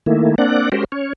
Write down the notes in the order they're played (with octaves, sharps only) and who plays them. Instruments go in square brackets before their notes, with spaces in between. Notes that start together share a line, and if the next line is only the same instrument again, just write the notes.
[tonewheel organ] D#3 A3 A#3 E4
A#3 C4 D4 D5 F#5
G#3 C#4 F#4 G4 A#4 C5
C#4 C#5